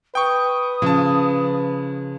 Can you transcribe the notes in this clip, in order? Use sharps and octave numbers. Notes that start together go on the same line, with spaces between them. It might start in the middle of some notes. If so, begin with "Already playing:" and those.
B4 G5 C#6 D#6
C#3 F3 A5